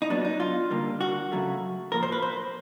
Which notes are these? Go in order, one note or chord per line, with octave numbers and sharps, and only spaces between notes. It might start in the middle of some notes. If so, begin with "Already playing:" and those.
D#4
A#2 F#3 B3 D4
D#4
F4
D3 G3 A#3
F#4
C#3 F#3 A3
A2 F3 A#3 A#4
C5
B4
C5